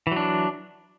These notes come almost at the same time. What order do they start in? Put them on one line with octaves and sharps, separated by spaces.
E3 F#3 D4